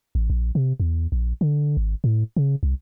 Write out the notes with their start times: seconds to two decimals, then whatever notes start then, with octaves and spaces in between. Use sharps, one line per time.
0.15 A1
0.30 A#1
0.55 C3
0.80 E2
1.12 A#1
1.41 D3
1.77 G#1
2.04 A2
2.37 C#3
2.63 C2